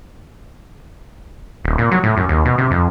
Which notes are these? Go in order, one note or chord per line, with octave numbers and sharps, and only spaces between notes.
D#1
A#2
F#3
A2
F#2
D#2
B2
C3
F2